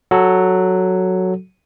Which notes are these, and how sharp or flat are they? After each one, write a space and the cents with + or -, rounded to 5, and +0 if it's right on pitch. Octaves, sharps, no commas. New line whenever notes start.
F#3 +0 F#4 +0 A4 +0